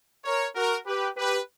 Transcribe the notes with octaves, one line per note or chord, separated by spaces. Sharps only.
A#4 C#5
F#4 A#4
G4 B4
G4 B4